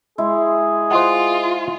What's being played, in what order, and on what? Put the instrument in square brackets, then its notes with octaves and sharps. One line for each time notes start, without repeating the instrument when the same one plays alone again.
[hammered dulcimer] G#3 E4 [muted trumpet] G#4
[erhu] F4 [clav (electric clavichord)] C5 D#5 F#5